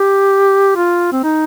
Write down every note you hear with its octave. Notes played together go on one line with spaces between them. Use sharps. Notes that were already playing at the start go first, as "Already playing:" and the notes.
Already playing: G4
F4
C4
D#4